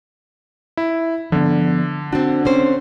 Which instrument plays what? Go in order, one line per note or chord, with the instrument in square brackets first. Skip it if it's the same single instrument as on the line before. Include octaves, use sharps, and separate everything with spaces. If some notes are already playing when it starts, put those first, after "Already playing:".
[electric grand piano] E4
[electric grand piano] D3 [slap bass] F3 B3
[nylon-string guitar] C4 F#4 [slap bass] D4
[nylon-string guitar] C4 C#4 C5